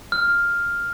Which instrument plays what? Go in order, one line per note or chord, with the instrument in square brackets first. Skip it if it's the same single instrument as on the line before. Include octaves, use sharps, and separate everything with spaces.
[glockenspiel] F6